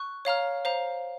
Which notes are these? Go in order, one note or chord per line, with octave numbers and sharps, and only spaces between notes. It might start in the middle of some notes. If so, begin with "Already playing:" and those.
Already playing: C#6 F#6
C#5 F5 A#5 F6
C5 F5 A#5